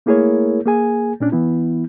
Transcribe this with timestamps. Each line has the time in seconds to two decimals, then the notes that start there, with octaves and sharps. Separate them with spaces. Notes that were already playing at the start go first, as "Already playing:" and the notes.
0.06 A3 A#3 E4 G#4 A#4 C#5
0.66 A#3 G#4 G#5
1.20 A#2 C#4 D4
1.32 E3 B3 E4